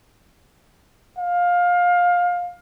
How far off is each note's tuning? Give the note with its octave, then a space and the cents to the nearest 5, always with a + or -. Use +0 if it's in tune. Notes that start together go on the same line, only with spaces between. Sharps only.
F5 +20